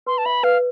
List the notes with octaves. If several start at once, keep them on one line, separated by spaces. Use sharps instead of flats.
B4 C6
A5
E5 B5
B4 F5